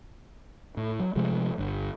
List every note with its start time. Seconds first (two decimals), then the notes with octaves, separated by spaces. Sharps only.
0.77 A2
0.99 F#3
1.16 C3 F3 G#3 A3
1.58 G1 G2